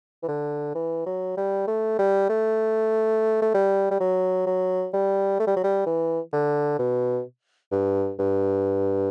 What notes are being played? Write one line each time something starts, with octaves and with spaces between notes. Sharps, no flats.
E3
D3
E3
F#3
G3
A3
G3
A3
A3
G3
G3
F#3
F#3
G3
A3
G3
F#3
G3
E3
D3
B2
G2
G2